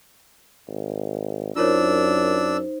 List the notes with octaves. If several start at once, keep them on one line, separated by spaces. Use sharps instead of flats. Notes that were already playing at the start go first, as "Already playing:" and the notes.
G#1
F#2 D4 D#4 F4 A#4 C5 C#5 E6